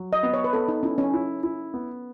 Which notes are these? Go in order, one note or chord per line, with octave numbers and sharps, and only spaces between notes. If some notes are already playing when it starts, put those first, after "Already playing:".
Already playing: F#3
D#5
B3
C#5
B4
B3 A4
D#4
C#4 E4
C#4
E4
E4
B3